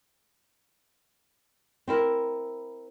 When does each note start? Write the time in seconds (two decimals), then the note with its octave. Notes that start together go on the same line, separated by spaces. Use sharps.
1.88 C4 E4 A#4